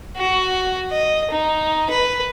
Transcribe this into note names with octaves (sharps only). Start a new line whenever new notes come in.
F#4
D#5
D#4
B4